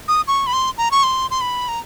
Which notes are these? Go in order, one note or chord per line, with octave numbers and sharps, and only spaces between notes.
D#6
C#6
B5
C6
A#5
C#6
C6
C6
B5
A#5